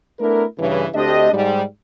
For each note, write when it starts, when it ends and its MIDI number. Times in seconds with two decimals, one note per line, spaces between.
0.20 0.45 57
0.20 0.45 59
0.20 0.45 62
0.20 0.45 64
0.20 0.45 70
0.59 0.86 43
0.59 0.86 49
0.59 0.86 52
0.95 1.30 38
0.95 1.30 57
0.95 1.30 60
0.95 1.30 62
0.95 1.30 67
0.95 1.30 75
1.33 1.63 44
1.33 1.63 55